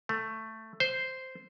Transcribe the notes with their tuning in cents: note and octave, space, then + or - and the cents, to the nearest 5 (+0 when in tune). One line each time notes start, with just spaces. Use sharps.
A3 +10
C5 -5